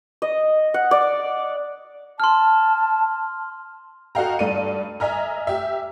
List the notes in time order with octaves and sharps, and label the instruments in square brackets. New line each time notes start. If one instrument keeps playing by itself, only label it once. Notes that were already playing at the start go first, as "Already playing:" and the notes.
[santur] D#5
F#5
D5
[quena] A5 [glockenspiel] C6 F6
[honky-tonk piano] F#4 A4 D#5 F5 G5 A#5
G2 A4 D5 D#7
D#5 E5 G#5 A#5 F6
G4 E5